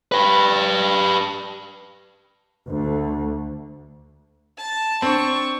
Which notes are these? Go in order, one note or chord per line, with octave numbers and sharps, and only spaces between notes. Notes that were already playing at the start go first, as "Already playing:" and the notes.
G4 B4
D2
A5
C4 D4 C#6